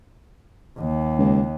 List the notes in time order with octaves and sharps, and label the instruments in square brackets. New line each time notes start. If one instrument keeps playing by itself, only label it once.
[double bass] D#2
[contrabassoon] C#2